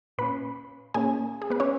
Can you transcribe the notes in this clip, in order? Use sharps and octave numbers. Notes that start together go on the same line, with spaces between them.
A#2 A#3 C#4 B4 B5
A#2 A#3 C#4 G#4 G#5
G#4
B3 B4
C#4 C#5